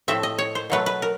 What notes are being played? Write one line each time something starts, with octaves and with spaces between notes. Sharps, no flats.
A2 F3 A3 C4 E5
D#5
C#5
C5
B2 F#3 A3 B4
B4
A#4